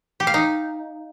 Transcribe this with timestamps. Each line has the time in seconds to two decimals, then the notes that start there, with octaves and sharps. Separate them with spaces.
0.20 G4
0.27 F5
0.34 D#4